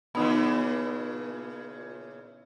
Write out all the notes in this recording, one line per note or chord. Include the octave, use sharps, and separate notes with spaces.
A#2 C#3 E3 B3 D#4